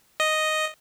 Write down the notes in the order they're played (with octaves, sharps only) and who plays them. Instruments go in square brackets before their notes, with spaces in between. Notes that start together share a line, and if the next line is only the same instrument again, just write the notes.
[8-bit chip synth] D#5